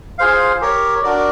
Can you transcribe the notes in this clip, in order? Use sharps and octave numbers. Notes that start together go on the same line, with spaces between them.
F4 G#4 C5 F5
G4 A#4 C#5
D4 F#4 A#4 D5